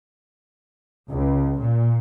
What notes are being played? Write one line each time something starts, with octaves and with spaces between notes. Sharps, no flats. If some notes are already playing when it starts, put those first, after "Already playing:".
C#2
A#2